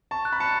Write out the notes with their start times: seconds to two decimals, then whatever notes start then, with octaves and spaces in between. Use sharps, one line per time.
0.11 A5 C#6
0.25 F#6
0.32 B5
0.40 A5 C#7